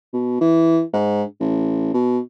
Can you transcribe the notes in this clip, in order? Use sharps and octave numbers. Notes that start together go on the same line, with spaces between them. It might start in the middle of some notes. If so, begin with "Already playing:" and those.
B2
E3
G#2
A1
B2